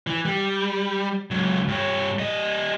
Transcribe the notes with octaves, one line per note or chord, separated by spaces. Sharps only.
E3
G3
C#2 F#3
G2 C#5
G3 D#5